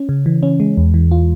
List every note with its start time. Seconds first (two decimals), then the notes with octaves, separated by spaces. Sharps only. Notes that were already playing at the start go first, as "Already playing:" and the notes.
Already playing: C#4
0.09 C#3
0.26 E3
0.43 C#4
0.60 G#3
0.77 E2
0.94 E3
1.11 F4